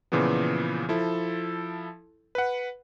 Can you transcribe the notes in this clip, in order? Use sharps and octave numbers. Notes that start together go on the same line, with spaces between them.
A#2 C#3 E3 F3 B3
F3 E4 A4
B4 F#5